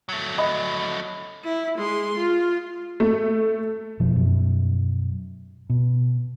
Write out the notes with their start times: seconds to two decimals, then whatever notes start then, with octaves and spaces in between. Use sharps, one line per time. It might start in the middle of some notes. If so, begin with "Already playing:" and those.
0.09 F#3 A3
0.38 D#5 B5
1.44 E4
1.78 G#3 C6
2.17 F4
3.00 A3
4.00 F1 B2 F3
4.13 F#2 B2
5.70 B2